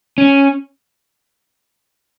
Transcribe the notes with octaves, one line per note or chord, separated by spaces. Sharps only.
C#4